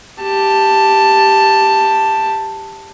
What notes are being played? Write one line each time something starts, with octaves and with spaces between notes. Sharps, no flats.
G4 A5